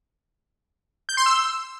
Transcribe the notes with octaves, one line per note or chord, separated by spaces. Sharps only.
G6
C6
E6